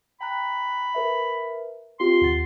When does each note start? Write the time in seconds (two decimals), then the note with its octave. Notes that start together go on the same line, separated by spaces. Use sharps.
0.20 G5 A#5 B5 F#6
0.95 A#4 B4 E5
2.00 C4 F4 G4 C6
2.21 D#2 F#5 A6